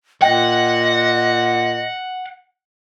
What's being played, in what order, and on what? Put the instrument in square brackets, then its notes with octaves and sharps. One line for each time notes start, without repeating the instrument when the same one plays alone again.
[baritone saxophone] A#2 [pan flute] D#5 [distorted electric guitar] F#5 [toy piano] G5